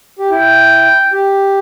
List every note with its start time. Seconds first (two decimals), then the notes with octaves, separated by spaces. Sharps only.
0.19 G4
0.31 E4 G5
1.13 G4